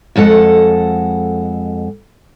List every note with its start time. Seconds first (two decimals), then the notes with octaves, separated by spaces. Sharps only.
0.16 F2 G#3 A4 F#5